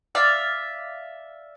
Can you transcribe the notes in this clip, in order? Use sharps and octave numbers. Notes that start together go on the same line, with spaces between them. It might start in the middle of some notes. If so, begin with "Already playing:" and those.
D5 E5 F5